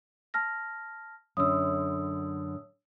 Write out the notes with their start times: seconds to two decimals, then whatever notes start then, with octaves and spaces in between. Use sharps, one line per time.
0.34 A5 F6 A#6
1.37 F#2 D3 D#6 E6